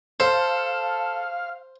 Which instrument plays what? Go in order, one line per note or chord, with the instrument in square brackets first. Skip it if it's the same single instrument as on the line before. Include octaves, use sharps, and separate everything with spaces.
[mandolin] A4 [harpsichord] C5 [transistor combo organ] F5